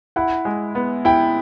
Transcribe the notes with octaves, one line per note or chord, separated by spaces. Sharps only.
E4 F#5
G#3
B3
E4 G5